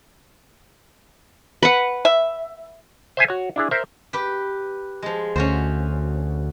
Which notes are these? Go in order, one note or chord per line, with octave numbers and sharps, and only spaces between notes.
B4 F#5
E5
C5 E5 G#5
F#4 C#5
D4 E4 G#4
A#4 C5 E5
G4 B4
F3 G#3
D2 C#4 F#4 C5